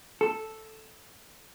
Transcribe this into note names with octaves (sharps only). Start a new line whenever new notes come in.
A4